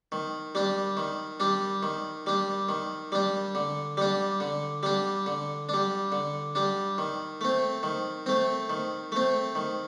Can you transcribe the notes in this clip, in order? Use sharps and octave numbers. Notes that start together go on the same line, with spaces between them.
D#3
G3 D4
D#3
G3 D4
D#3
G3 D4
D#3
G3 D4
D3
G3 D4
D3
G3 D4
D3
G3 D4
D3
G3 D4
D#3
A3 C4
D#3
A3 C4
D#3
A3 C4
D#3